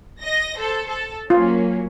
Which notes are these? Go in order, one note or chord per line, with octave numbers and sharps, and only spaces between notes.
D#5 A#6
A4 C5
A4
F#3 A#3 C#4 F4